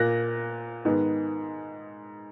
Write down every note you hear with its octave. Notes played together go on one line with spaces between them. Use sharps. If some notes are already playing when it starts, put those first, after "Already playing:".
Already playing: A#2 A#3 F#6 A#6
G#2 D#3 G#3 B3